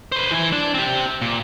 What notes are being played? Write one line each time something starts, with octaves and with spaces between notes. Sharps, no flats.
B4 C5
E3 G#5
D4
C4 G4
A#2